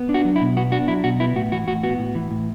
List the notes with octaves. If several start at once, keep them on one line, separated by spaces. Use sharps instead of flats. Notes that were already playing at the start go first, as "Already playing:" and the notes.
Already playing: B3
D4
F#4
F#3
E4
B2
B3 F#4
D4 F#4
F#3 E4
B2 F#4
B3 E4
A2 F#4
E3 F#4
A2 F#4
B3 F#4
A2
E3
A2